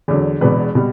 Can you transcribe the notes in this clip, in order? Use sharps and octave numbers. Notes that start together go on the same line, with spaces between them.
E2 D3 F#3
E1 E2 B2 B4
B2 G3